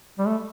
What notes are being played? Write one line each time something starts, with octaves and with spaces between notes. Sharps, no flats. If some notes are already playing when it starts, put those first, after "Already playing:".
G3
A3